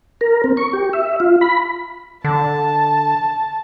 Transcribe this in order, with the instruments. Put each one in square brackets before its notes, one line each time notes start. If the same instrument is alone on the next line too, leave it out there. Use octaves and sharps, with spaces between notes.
[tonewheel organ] A#4
C4
C#6
G4
E5
F4
B5
[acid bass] D3 [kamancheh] A5